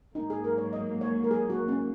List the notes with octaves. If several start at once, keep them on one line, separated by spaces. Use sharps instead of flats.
G#2 F#3 A#3 D#4
G#4
A#4
C#5
D#5
C#5
A#4
G#4
F#4
C#4